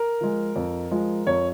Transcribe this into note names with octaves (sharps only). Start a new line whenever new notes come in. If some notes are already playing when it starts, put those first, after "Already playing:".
Already playing: A#4
F3 G#3
F2
F3 G#3
F2 C#5